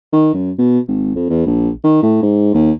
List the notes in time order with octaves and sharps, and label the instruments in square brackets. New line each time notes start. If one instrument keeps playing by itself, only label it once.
[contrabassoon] D#3
F#2
B2
G#1
F2
E2
A#1
D#3
A2
G#2
D#2